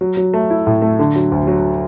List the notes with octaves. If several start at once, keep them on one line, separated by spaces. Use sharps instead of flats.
F#3
F#3
A3
E4
A2
A3
D3
F#3
D2
F#3